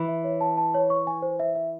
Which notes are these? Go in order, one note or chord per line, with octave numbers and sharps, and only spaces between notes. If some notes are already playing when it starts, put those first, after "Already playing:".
Already playing: E3
E5
C#5
A5
A5
C#5
C#6
G#5
C5
E5
E5